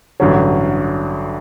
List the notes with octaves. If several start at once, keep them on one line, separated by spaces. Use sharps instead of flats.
A1 G2 D3 F#3